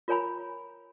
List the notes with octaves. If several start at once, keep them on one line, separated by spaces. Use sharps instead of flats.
F4 A#4 C#5 G#5 A#5 B5